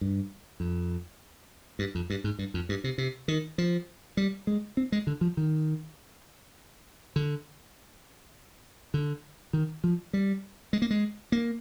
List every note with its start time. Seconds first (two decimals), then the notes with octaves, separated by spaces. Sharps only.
0.01 G2
0.60 F2
1.79 G2
1.95 F2
2.10 G2
2.24 G#2
2.39 G2
2.54 F2
2.69 G2
2.84 C3
2.98 C3
3.28 D#3
3.58 F3
4.17 G3
4.47 G#3
4.77 C4
4.92 G#3
5.07 D3
5.21 F3
5.37 D#3
7.16 D3
8.94 D3
9.53 D#3
9.84 F3
10.13 G3
10.73 G#3
10.82 A#3
10.91 G#3
11.32 A#3